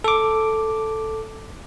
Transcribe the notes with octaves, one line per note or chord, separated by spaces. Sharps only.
A4 D6